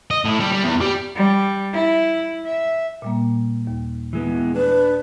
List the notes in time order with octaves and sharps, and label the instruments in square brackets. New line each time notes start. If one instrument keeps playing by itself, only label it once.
[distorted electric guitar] D#5
A2
G3
G3
E2
G3
[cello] G3
E4
E5
[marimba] A#2 G3 A#3
D#2
[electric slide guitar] E3 G#3 B3
[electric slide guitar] D4 [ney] B4